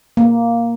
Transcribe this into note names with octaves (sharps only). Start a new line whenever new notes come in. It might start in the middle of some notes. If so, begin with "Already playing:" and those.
A#3